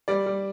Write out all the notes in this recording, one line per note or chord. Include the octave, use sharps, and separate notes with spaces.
G3 D5
G3